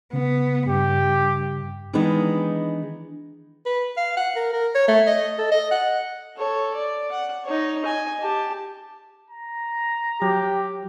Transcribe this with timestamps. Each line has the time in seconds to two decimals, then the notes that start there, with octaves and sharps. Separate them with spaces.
0.13 C#3 B3
0.68 G2 G4
1.93 D#3 E3 G#3 B3 D4 D#4
3.66 B4
3.97 F5
4.17 F#5
4.36 A#4
4.53 A#4
4.75 C#5
4.88 A3
5.07 D#5
5.38 A4
5.51 D#5
5.71 F#5
6.37 A4 C#5
6.74 D5
7.11 F#5
7.44 D#4 C#5
7.84 D#5 G#5
8.21 G4 A5
9.30 A#5
10.22 F#3 G4